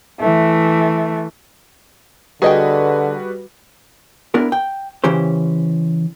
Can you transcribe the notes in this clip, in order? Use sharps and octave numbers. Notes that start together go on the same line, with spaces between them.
E3 A3
D3 G3 F#4 G#4 B4 D#5 G5
B3 D4 E4 A#4
G5
C#3 E3 C#4 G4 C5